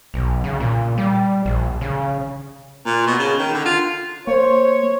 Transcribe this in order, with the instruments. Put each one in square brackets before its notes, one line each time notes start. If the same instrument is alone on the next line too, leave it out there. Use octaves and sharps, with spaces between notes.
[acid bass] B1
C#3
A#2
G3
A#1
C#3
[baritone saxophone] A#2
B2
C#3
D#3
D3
F4
[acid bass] A#3 [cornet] C5 [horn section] C#5